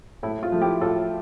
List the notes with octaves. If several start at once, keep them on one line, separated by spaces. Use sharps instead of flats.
A2 E4
F4
F3 A3
E4 G4
A2 F4 A4